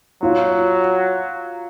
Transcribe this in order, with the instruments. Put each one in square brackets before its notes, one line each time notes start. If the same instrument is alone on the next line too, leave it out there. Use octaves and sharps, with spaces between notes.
[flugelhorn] F#3 [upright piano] F4